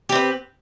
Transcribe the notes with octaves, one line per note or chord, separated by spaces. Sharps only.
C4 G4 B4